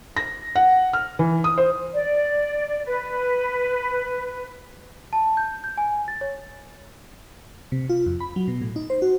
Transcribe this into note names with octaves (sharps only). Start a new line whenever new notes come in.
A#6
F#5
F6
E3
D#6
C5
D5
B4
A5
G6
G6
G#5
A6
C#5
C3
F4
F2
B5
F#3
B2
A2
D#4
C5
F#4